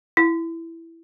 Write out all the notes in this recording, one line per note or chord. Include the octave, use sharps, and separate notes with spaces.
E4